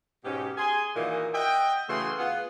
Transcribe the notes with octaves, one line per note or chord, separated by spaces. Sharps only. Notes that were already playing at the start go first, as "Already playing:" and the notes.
G#2 B2 C#4 G4
G#4 G#5 C6
A#2 D#3 E3 A#3 F#4
D#5 E5 F#5 G5
C#3 E3 A3 F#4 G#4 C6
B3 F4 G#4 F#5